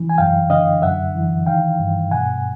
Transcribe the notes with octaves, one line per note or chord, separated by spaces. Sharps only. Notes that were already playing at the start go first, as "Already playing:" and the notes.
Already playing: E3
G#5
F#2 F5 G5
D3 D#5 F5
F#2 E5 F#5
E3
D#3 F5 G5
G2
B2 F#5 G#5